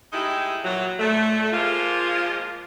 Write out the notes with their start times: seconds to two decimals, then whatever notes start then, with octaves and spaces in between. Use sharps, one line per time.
0.12 G#3 A3 D#4 E4 G4
0.63 A#2 E3 F#3
0.99 A#2 A3
1.52 F3 G#3 A#3 F4